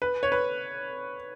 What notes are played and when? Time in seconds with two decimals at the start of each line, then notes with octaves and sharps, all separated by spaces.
0.02 B4
0.23 C#5
0.32 B4